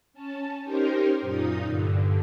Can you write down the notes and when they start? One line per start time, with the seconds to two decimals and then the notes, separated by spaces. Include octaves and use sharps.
0.13 C#4 A5
0.63 C#4 D#4 G4 A#4 C5
1.21 F#2 A#2 D#4 D#6
1.66 G2 D3